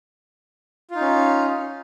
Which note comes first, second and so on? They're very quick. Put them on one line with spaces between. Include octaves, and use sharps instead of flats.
F4 D#4 C#4